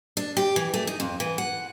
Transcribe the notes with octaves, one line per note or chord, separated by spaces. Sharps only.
D4
G4
E3
A3
D#4
F2
E3
F#5